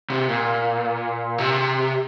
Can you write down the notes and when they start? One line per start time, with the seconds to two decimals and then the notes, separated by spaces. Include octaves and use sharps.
0.10 C3
0.29 A#2
1.38 C3